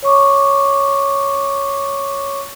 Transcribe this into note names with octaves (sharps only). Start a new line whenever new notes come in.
C#5 C#6 D6